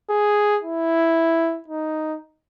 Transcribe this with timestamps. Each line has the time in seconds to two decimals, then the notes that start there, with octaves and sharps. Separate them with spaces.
0.10 G#4
0.63 E4
1.69 D#4